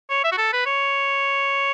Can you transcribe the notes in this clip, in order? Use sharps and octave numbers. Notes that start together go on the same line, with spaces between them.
C#5
E5
F#4
A4
B4
C#5